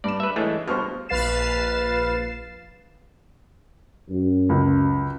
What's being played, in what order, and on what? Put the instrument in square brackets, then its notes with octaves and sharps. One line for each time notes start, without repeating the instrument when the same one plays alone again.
[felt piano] G2 E7 [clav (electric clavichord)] D5
[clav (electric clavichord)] B4 E5
[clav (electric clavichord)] E3 G#3 A3 [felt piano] G#4 C#5 D#5
[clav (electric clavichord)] G2 B2 [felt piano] C5 C#6 F6
[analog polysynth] A#1 B4 F5 A6 C7 E7
[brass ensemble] F#2
[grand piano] C#2